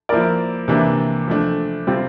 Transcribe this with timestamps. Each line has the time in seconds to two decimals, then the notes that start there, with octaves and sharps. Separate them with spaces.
0.09 F3 A#3 E4 A#4 D5
0.68 C3 E3 A#3 D4
1.28 F3 A3 D4
1.87 C3 G3 C4 F4